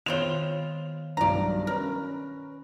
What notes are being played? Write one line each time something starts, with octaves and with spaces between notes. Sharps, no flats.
D#3 G#3 B3 C4 F4 C#5 F7 G7
B1 G2 D5 A#5
C#4 A#4 B4